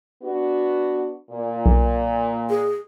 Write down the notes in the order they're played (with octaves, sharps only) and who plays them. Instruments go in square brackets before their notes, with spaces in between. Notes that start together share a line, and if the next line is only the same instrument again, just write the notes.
[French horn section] B3 D4 F#4
A#2
[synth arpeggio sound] B1
[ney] G#4